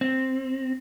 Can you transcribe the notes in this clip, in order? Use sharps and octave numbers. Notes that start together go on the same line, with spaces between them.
C4